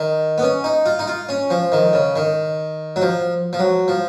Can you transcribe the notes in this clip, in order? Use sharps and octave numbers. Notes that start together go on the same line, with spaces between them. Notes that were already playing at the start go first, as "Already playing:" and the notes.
Already playing: D#3
B3
C#4
D#4
F4
D#4
F4
C#4
F3
D#3
C#3
D#3
F#3
F3
F3
F#3
F3